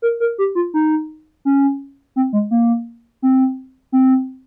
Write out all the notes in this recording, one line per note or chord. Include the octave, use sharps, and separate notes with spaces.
A#4
A#4
G4
F4
D#4
C#4
C4
G#3
A#3
C4
C4